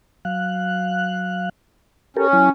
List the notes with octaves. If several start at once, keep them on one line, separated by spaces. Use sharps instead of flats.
F#3 F5 F#6
C#4 G4 A4 A#4
F#3 E4